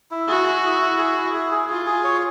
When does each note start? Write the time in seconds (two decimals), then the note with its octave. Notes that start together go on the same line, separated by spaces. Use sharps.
0.11 E4
0.28 F#4 G#4
0.47 E4
0.64 E4
0.82 E4
0.98 G#4
1.17 E4
1.33 G#4
1.52 G#4
1.69 F4 G#4
1.86 G#4
2.04 C#5